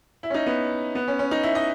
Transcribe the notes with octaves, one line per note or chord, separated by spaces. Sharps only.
E4
C#4
D#4
B3
B3
C#4
C#4
D#4
E4
D#5